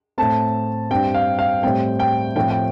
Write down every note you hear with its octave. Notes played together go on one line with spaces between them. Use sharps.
A2 A3 C4 A5
G2 G3 C4 G5
F5
F5
A2 G3 C4 G5
G5
A2 F3 A3 C4 G5
G5